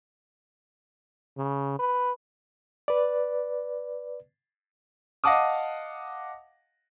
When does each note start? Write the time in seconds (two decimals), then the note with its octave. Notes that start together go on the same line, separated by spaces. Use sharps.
1.37 C#3
1.79 B4
2.88 B4 D5
5.24 D#5 F5 F#5 A5 D6 D#6